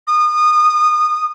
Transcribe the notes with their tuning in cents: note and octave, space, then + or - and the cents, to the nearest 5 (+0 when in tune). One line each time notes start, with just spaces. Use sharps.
D#6 -25